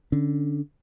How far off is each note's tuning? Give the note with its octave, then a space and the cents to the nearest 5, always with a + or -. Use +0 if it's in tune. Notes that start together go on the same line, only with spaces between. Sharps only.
D3 +0 C#4 +0